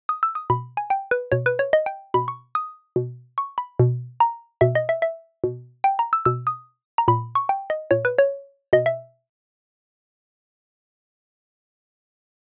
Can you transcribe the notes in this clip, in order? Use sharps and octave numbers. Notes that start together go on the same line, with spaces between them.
D#6
E6
D#6
B2 B5
G#5
G5
B4
B2 C#5
B4
C#5
D#5
G5
B2 B5
C#6
D#6
B2
C#6
B5
B2
A#5
B2 E5
D#5
E5
E5
B2
G5
A#5
E6
B2 E6
D#6
A#5
A#2 B5
C#6
G5
D#5
A#2 C#5
B4
C#5
B2 D#5
E5